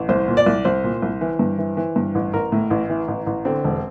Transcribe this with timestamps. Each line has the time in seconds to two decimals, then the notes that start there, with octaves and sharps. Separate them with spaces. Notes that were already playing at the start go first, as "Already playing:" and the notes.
Already playing: A1
0.09 C2 C5
0.28 A#2
0.37 D5
0.46 C2
0.65 C2 C5
0.84 A#2
1.02 C2
1.21 E3
1.39 G2
1.58 E3
1.77 E3
1.96 G2
2.15 A1
2.34 A1 A#4
2.52 A2
2.70 A1
2.89 E3
3.08 A1
3.26 A1
3.45 D3 C4
3.64 E1